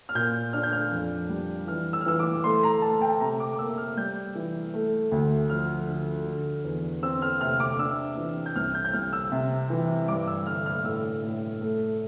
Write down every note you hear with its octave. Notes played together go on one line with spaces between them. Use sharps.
F6
A#2 G6
D4 F6
G6
F6
F2
G3
E3 F6
E6
F6
E3 E6
D6
A3 C6
A#5
A3 A5
G5
C3 A#5
D6
D6
A#3 E6
F6
G3 G6
E3
A3
D2
F3 F6
D3
D3
E2
C4 E6
F6
C3 F6
D6
D4 E6
E3
G6
C2 F6
G6
G6
C2 F6
E6
C3
E3
G2 D6
E6
D3 F6
F6
A2 E6
A2
A3